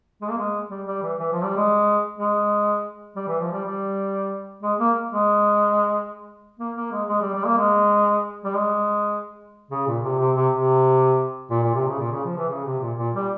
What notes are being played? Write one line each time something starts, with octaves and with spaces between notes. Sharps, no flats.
G#3
A#3
G#3
G3
G3
E3
E3
F3
G3
G#3
G#3
G3
E3
F3
G3
G3
G#3
A#3
G#3
A#3
A#3
G#3
G#3
G3
G3
A#3
G#3
G3
G#3
C#3
A#2
C3
C3
C3
C3
A#2
A#2
C3
C#3
A#2
C#3
F3
E3
C#3
C3
A#2
A#2
G3